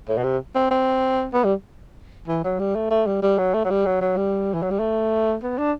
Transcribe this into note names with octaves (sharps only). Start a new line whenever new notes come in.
A2
B2
C3
C4
C4
B3
G3
E3
F#3
G3
A3
A3
G3
G3
F#3
A3
F#3
G3
F#3
F#3
G3
E3
F#3
G3
A3
B3
D4